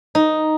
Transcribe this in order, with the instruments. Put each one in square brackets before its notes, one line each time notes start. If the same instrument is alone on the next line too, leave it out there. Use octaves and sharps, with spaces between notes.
[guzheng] D#4